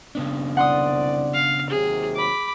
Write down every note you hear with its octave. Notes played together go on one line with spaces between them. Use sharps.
C#3 B3 D4
C2 D5 F#5 C6 D#6
F5
D#2 C3 F#3 G#4
B5 D6